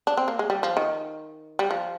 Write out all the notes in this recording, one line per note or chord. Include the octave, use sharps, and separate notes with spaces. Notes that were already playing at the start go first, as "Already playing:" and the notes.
D4
C4
A#3
G#3
G3
F3
D#3
G3
F3